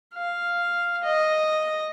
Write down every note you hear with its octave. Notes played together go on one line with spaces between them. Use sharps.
F5
D#5